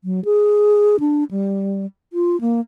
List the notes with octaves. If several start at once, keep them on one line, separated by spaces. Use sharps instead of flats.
F#3
G#4
D4
G3
F4
A#3